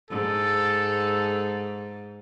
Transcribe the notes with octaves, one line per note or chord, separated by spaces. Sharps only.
G#2 A4